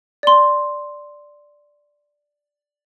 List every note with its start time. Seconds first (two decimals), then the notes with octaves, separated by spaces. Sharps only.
0.23 D5 C6